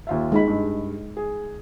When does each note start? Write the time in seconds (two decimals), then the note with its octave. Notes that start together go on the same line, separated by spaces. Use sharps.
0.07 D#2 F4 E5
0.32 G#3 D#4 B5
0.47 G2
1.17 G#4